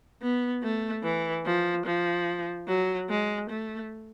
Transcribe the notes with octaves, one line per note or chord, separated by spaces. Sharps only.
B3
A3
E3
F3
F3
F#3
G#3
A3